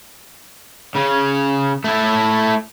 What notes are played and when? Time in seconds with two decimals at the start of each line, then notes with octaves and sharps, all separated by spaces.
0.96 C#3
1.84 A3 E4